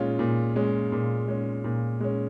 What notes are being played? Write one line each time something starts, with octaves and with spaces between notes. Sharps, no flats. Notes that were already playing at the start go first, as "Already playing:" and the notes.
Already playing: A#2 G#3 C#4 F4
A#2
G#3 C#4
A#2
G#3 C#4
A#2
G#3 C#4